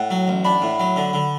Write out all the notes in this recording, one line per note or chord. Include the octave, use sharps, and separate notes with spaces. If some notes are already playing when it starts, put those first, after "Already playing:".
Already playing: A2 F#5
F#3
A1
D4 B5
A2
F#3
D3
D3